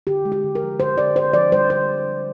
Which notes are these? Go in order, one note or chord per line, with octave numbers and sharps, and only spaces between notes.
D3 G4
G#3
G4
D3
A#4
F3
D3 C5
D3 D5
D3 C5
F3 D5
G3 C5
D3 C5